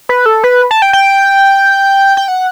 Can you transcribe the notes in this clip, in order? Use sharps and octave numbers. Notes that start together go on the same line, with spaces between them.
B4
A4
B4
A5
G5
G5
G5
F#5